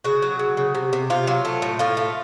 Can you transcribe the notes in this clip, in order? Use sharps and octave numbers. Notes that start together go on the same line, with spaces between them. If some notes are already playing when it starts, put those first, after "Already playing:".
C#3 F#4
F#3
C#3
C#3
C3
C3
C3 F4
F#3
A3
A2
A2 F4
A3